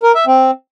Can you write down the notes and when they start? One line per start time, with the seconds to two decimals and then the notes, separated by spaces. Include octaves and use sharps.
0.03 A#4
0.15 E5
0.27 C4